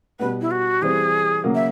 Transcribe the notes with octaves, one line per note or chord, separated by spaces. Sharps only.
B2 G3 B3 B4
E4
F#4
E3 G3 C4 G#4
C#3 F#3 A#3
E5